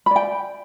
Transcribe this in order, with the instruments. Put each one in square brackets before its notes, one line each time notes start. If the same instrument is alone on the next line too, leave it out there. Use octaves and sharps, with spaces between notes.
[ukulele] B5
D5
G5